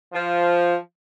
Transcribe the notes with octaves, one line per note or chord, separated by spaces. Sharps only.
F3